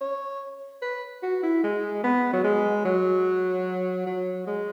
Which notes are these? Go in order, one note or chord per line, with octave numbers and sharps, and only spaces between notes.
C#5
B4
F#4
E4
G#3
B3
F#3
G#3
F#3
F#3
G#3